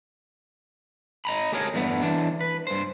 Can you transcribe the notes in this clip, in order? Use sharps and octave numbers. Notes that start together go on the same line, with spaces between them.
D#5 A#5 B5
A3 G4 G#4 A#4 C#5
E2 G2 A3 B3
E3 D4
B4
G2 C5